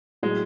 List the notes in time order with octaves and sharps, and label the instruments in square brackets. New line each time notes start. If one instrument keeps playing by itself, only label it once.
[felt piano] A2 F#3 [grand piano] G#3